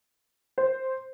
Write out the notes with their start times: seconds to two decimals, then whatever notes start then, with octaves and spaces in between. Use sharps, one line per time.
0.58 C5